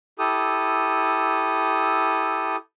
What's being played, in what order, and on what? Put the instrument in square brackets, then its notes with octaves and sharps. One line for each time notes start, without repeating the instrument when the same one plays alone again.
[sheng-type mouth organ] E4 G4 A4 D#6